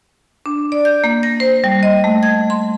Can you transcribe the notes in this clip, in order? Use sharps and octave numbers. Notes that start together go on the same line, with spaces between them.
D4
D5
G6
A#3
A#6
C5
G3
D#5
A3
G#6
C6